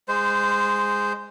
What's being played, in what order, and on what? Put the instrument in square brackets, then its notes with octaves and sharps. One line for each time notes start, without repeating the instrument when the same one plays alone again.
[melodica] G#3 C5